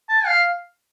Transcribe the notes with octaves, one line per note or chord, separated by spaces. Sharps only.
A5
F5